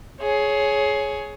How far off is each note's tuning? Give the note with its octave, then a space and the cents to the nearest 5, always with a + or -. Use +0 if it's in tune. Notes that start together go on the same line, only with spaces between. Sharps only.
G#4 +20 C#5 +0